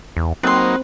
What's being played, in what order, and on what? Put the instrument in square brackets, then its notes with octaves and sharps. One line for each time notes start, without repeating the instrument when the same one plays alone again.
[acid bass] E2
[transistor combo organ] F#3 A#3 D#4 [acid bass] C4 [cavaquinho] B4 C6